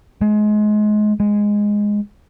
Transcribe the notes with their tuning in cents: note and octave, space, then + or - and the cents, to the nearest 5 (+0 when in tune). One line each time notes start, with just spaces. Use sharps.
G#3 +25
G#3 -5